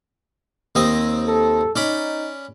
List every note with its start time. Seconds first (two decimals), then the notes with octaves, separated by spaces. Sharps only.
0.75 D#2 C4 D#5
1.26 A4
1.76 C#4 D#4 D5 B5